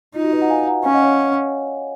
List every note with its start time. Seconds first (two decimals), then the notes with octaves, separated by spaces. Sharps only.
0.15 D#4 F4
0.24 F#4
0.32 B4 D#5
0.42 F#5 A#5
0.50 F5 G#5
0.67 F#5 A#5
0.85 C#4 F5 G#5
0.94 D#5 F#5
1.02 C#5 F5